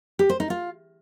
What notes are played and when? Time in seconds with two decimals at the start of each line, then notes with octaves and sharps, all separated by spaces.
0.19 G4
0.29 C5
0.40 D#4
0.50 F4